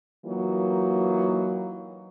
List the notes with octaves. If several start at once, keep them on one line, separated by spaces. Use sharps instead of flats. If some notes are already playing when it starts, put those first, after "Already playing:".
E3 F#3 A#3 D#4 F4